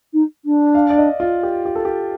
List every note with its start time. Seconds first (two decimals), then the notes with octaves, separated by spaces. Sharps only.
0.13 D#4
0.45 D4
0.75 F5
0.90 D5
0.98 D#5
1.20 F4
1.43 G4
1.65 G4
1.75 A4
1.85 G4